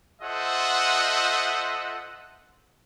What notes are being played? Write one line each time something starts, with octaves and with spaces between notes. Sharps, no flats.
F4 A4 C5 D#5 E5 F#5